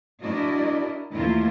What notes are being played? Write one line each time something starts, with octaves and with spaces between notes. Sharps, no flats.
D4 E4 F#4 A#4 D5 D#5
D#2 E3 A3 E4 F4 A#4